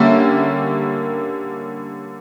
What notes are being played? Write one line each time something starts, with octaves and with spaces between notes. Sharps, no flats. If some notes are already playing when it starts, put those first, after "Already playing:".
Already playing: D3 G3 A#3 C#4 E5